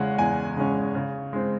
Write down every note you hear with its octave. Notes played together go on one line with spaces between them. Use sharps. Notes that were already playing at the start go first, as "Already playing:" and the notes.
Already playing: E2 C#3 G#3 C#4 F#5
E2 G#5
C#3 G#3 C#4
C#3
G#3 C4